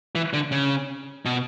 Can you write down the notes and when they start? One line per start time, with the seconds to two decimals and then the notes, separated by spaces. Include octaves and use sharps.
0.15 E3
0.33 D3
0.52 C#3
1.25 B2